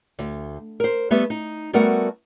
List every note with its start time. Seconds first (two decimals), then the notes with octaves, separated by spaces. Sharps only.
0.19 D2
0.80 A#4 C5
1.11 G3 A3 B3 B4 E5
1.30 D#4
1.73 G3 A3 B3 F#4 A#4 F#5